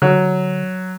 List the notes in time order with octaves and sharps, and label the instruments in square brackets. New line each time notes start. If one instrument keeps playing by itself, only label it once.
[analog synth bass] D3 [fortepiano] F#3